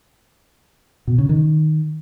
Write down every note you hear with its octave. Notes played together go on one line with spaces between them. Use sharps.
B2
C#3
D#3